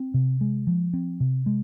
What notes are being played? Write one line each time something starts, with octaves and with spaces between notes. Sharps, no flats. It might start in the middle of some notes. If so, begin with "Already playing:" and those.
Already playing: C4
C3
G#3
F3
C4
C3
G#3